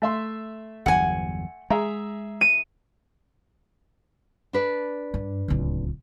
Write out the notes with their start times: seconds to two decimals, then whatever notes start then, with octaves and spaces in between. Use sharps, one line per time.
0.02 A3 E5 C6
0.86 G1 E2 F#3 F#5 G#5
1.70 G#3 G#4 E5 A#5
2.41 D#7
4.53 D4 B4 D5
5.14 G2
5.48 D1 C#2